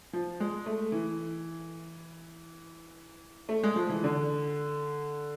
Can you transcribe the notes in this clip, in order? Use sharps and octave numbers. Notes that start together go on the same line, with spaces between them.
F3
G#3
A3
E3
A3
G#3
F3
E3
D3